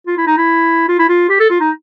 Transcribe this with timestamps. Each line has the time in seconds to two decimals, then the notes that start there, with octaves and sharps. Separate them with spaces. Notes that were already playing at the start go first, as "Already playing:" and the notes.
0.07 F4
0.17 E4
0.27 D#4
0.37 E4
0.88 F4
0.99 E4
1.09 F4
1.29 G4
1.40 A4
1.50 F4
1.60 D#4